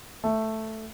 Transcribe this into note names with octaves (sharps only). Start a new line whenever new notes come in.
A3